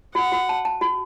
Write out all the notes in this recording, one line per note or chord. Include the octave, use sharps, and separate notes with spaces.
F#4 F#5
F#4
A5
A5
F#4